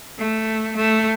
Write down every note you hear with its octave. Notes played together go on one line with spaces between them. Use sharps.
A3
A3